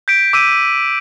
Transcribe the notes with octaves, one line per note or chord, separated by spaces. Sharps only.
G6 B6 D7
D6 E6 B6 D#7